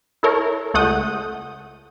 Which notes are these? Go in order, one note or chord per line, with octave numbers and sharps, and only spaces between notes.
E4 A4 A#4 C#5
C#2 A3 F#5 D#6 G6